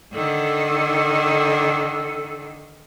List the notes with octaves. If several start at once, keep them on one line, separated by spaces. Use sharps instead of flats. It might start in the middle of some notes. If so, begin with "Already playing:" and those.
D3 D#3 A4